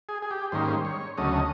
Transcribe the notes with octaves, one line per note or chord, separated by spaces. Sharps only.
G#4
G#4
G4
G#2 D#3 G3 A#3 C#4 C5
C#5
D2 C#3 F#3 A3 C#4 D#5